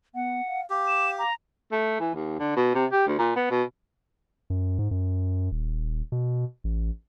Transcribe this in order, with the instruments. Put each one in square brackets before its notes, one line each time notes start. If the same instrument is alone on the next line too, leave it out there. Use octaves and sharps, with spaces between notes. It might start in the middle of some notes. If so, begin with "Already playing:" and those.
[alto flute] B3 [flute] F#5
[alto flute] F5
[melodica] G4 [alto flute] F5 [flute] D6
[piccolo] E7
A#5
[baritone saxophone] A3
E3
D#2
D3
B2
C3
G4
D2
A#2
B3
B2
[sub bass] F#2
G#2
F#2
D#1
B2
A1